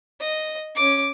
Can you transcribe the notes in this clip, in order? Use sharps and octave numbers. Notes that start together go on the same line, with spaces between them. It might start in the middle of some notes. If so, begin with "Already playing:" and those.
D#5
C#4 D6